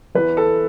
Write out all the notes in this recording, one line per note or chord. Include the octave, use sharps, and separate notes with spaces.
E2 E3 B4
A4